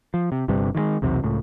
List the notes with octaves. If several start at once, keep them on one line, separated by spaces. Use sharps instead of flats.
F3
C3
G1 G2 C3 G3
D#3 E3 G#3
B1 E2 C3 F#3
C#2 A2